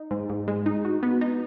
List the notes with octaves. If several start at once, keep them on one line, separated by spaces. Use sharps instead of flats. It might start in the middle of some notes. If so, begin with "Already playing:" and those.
Already playing: D#4
G#2
G#2
G#3
D#4
F#4
B3
D#4